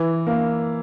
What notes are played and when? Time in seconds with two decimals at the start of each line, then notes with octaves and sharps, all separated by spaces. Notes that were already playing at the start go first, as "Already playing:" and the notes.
Already playing: E3
0.27 A#3